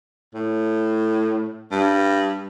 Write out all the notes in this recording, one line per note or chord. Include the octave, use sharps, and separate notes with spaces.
A2
G2